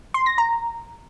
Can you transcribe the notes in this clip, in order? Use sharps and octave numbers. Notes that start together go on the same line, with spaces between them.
C6
A#6
A#5